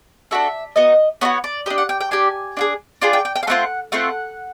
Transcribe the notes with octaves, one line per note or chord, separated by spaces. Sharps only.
D4 F#4 A4 E5
B3 D#4 F#4 D#5
B3 D#4 F#4 C#5
D5
D4 G4 D#5
F#5
G5
G5
D4 G4 G#5
D4 F4 G#4
D4 F4 G#4 G5
G5
G5
G5
F5
A3 C4 F4 F#5
A3 C4 F4 F#5